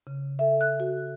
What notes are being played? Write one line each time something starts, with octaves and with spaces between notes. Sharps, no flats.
C#3
A4 E5
F#6
F#4